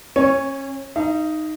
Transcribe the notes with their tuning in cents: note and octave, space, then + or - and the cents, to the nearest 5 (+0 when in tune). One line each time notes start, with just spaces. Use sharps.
C#4 -30 C#5 +0
D#4 +0 F5 -45